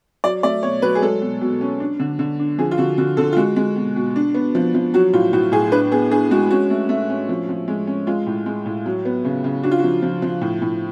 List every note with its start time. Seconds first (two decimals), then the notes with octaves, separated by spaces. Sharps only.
0.24 F#3 D5
0.43 A3 D5
0.63 B2 C#5
0.82 F#3 B4
0.95 G#4
1.02 G#3 A4
1.22 B2
1.41 B2
1.61 C#4
1.80 D4
2.00 D3
2.19 D3
2.39 D4
2.58 F3 G#4
2.71 F4
2.78 D3 F#4
2.98 D3 F#4
3.17 D3 A4
3.33 F4
3.36 G#3 F#4
3.56 G#3
3.76 B2
3.96 B2
4.16 D4
4.34 B3
4.55 F3
4.75 F3
4.94 F#3 F#4
5.13 A2 F4
5.33 A2 F#4
5.52 A2 G#4
5.72 D4 B4
5.91 B3 G#4
6.11 D4 G#4
6.31 G#3 F#4
6.51 C#4 F#4
6.70 A3
6.89 A3
7.10 C#4
7.29 F3
7.49 F3
7.68 G#3
7.87 C#4
8.07 G#3 F4
8.27 A2
8.46 G#3
8.66 A2
8.86 F#3
9.05 B3
9.25 C#3
9.44 C#3
9.63 D4 F#4
9.71 F4
9.79 F3 F#4
10.02 F3
10.22 F3
10.42 A2
10.62 A2